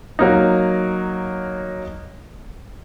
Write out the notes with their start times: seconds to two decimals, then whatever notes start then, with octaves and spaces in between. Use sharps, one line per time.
0.19 F#3 A#3 D#4